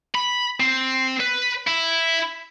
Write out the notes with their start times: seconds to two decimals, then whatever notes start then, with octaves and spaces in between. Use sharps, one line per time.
0.15 B5
0.60 C4
1.20 B4
1.67 E4